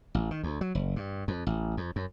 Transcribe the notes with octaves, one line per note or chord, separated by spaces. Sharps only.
A1
D#3
D2
F#3
F#1
G2
F2
A1
F2
F#2